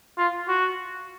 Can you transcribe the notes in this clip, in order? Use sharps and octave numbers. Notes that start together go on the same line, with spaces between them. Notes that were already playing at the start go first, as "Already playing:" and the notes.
F4
F#4